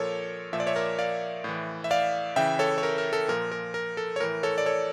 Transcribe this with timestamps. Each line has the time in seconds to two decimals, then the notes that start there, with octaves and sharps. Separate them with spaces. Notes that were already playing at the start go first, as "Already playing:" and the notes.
Already playing: A#2 F3 A4 A#4 C#5
0.53 A#2 F3 E5
0.60 D5
0.67 C#5 E5
0.75 A#4 D5
0.99 D5 F5
1.44 A2 E3
1.84 E5
1.91 D5 F5
2.36 C#3 E3 E5 G5
2.59 A4 C#5
2.78 C#5
2.83 A#4
2.98 A#4
3.13 A4
3.28 A#2 F3 A#4
3.51 A#4
3.74 A#4
3.97 A4
4.16 C#5
4.20 A2 E3 A#4
4.43 A4 C#5
4.58 D5
4.66 A4 C#5